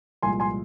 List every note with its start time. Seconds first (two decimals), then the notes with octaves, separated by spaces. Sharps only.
0.23 C2 A#2 F3 G#3 G#5 C6
0.40 G#5 C6